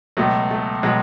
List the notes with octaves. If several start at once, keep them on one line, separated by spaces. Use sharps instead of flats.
C#2 B2 F#3 A3
A3
B2 F#3 G#3